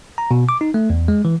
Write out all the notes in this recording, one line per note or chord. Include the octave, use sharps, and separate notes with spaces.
A#5
B2
D6
D#4
A3
E2
G#3
E3